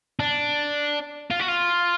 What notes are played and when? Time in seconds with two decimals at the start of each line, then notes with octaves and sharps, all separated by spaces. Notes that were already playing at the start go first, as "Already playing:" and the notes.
0.20 D4
1.31 F4
1.40 F#4
1.49 F4